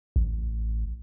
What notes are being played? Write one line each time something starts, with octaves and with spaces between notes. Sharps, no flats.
A1